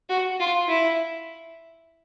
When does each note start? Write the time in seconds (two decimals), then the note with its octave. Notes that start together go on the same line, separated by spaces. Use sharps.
0.09 F#4
0.40 F4
0.68 E4